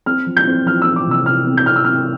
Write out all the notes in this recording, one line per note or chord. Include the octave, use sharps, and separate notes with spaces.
C4 F6
F3
G6
C4
F3 F6
C4 E6
D6
C3 E6
C3 F6
C4
G6
C3 F6
E6
C3 F6